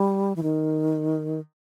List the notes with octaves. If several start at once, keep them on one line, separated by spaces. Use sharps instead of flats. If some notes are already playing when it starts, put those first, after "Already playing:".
Already playing: G3
E3
D#3